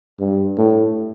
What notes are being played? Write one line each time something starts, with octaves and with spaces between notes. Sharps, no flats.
G2
A2